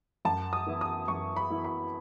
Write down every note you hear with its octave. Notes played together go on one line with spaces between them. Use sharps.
F#2 A5
D#6
E3 B3 E4
D#6
F#2 C#6
B5
E3 B3 E4
B5